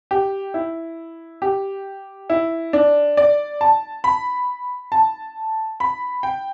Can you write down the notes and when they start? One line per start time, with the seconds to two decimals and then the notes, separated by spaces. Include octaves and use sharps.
0.11 G4
0.54 E4
1.42 G4
2.30 E4
2.73 D4
3.17 D5
3.61 A5
4.04 B5
4.92 A5
5.80 B5
6.23 G5